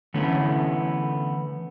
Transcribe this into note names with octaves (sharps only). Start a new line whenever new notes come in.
D3 E3 A3 B3 C#4